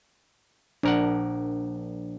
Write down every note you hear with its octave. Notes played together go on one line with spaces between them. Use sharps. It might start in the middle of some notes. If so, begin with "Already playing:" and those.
A#1 D4 A#4 F#5